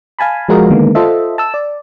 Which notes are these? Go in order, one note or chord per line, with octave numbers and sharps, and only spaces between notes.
F5 G#5 A5 B5
F3 G#3 F#4 A#4 D#5 F5
D3 D#3 G#3 A#3 B3
F4 A4 C5 D#5 E5
A5 E6
D5